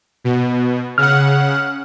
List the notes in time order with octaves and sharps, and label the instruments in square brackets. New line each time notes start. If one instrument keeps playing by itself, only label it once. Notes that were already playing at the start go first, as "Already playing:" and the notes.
[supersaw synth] B2
[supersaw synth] C#3 F#5 [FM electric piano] F6